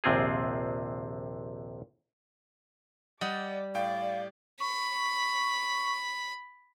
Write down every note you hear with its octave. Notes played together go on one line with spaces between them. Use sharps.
A#1 D#2 C3 C4 F4 G#4
G3 D5 D#5 F#5 D#6
A2 D5 F5 G5
B5 C#6